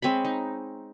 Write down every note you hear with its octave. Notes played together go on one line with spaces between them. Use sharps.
G#3 C4 C#5 B5
D#4